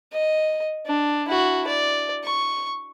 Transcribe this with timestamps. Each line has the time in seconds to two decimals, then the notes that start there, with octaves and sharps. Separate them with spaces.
0.13 D#5
0.86 D4
1.28 E4 F#4
1.67 D5
2.24 C#6